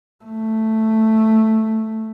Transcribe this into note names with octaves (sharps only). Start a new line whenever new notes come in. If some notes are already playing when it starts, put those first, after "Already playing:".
A3